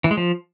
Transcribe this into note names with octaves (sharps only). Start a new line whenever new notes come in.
E3
G#3
F3